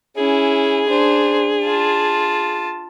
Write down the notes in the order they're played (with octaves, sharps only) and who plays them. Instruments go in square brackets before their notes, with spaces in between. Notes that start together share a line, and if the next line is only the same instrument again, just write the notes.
[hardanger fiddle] C#4 E4 [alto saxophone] G#4
[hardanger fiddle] D4 C5
F4 A5